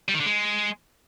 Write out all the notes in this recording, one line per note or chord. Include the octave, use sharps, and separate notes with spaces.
G3
D#3
D3
G#3